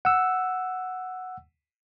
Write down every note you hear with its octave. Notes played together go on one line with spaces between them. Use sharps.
F#5 E6